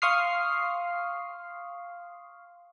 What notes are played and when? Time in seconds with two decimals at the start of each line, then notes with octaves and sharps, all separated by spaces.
0.02 F5 C6 C#6 D#6 F6 C7